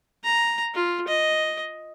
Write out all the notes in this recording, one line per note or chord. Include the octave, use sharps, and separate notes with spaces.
A#5
F4
D#5